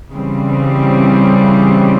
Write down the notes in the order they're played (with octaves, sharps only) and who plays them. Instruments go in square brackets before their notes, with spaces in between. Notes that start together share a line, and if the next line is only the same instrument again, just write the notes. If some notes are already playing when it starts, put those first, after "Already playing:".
[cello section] C#3 E3 G3 C4